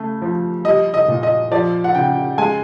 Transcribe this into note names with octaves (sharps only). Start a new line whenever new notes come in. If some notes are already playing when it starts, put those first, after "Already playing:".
Already playing: C#3 A3
F3
G3 D#5
D#5
A#2
D#5
F3 D5
F#5
C#3 G5
G#3 G#5